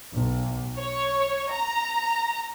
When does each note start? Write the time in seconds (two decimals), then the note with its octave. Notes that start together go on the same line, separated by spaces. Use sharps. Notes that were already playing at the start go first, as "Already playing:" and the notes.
0.14 B1
0.78 C#5
1.52 A#5